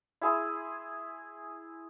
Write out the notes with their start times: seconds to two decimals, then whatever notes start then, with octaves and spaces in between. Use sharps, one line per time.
0.21 E4 G#4 C6